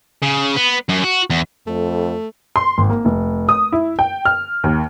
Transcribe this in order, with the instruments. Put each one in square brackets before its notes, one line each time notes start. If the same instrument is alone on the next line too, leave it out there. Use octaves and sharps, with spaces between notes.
[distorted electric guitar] C#3
B3
F#2
F#4
E2
[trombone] F2 [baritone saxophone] A3
[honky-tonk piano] C6
G#1
A#3
F1
D#6
E4
G5
F6
D#2